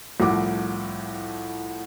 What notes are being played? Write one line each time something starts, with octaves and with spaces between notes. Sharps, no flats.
C2 A2 F3 F#5 D6